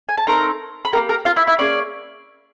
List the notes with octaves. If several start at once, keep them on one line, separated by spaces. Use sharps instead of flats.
G#5
A5
A3 C4 D#4 A#4 A#5
B5
A#3 D#4 G4 A#4 A#5
A#4 A#5
F4 F5
E4 E5
E4 E5
A#3 C#4 G#4 D5